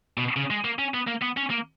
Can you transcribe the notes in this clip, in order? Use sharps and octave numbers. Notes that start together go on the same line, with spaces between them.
B2
C#3
G#3
A#3
C#4
B3
A#3
B3
C#4
A#3